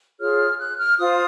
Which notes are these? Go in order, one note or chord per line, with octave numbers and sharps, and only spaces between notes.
F4 G#4 C#5 F6
F#6
F6
F4 C5 D#6